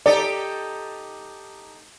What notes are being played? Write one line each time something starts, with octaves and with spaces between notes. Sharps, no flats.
D#4 G4 A4 D5